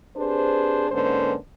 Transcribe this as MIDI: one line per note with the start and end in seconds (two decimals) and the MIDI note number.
0.17 0.87 60
0.17 0.87 62
0.17 0.87 67
0.17 0.87 68
0.17 0.87 71
0.17 0.87 72
0.91 1.34 44
0.91 1.34 50
0.91 1.34 58
0.91 1.34 61
0.91 1.34 71
0.91 1.34 72